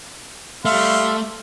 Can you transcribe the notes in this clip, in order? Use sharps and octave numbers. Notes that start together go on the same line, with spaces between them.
G3 A3 E5 F5 C6